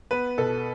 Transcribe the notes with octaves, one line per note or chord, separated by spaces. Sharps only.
B3 B4
B2 A4